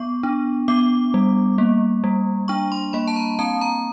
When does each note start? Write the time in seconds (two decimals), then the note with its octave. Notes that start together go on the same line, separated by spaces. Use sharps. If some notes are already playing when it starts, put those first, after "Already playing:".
Already playing: B3 C#6
0.23 D4
0.68 B3 D6
1.14 G3
1.58 A#3
2.04 G3
2.48 D4 C#6
2.72 C6
2.93 A#3 B5
3.08 A5
3.16 A#5
3.39 C4 A5
3.61 A#5